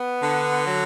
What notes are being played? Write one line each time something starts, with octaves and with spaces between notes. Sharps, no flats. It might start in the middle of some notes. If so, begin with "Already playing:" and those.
Already playing: B3
D3
F#3